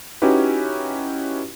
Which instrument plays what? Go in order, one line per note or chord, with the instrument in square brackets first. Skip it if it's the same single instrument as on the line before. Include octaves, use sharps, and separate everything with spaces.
[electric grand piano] C#4 D#4 E4 F#4 G4 B4